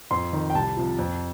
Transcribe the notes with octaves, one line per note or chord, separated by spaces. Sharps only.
F2 C6
D#3
G5
C2 A5
C3 F3
F2